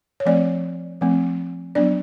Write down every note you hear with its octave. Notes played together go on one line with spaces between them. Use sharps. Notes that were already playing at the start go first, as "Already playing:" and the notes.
C#5
F3 A3 C4 D5
F3 A3 C4
F#3 B3 D4 D5